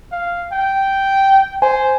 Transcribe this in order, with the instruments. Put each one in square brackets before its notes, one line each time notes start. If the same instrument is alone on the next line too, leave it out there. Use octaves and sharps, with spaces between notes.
[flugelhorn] F5
G5
[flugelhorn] C5 [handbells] G#5